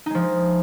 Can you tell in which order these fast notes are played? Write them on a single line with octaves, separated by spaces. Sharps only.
D#4 G#3 F3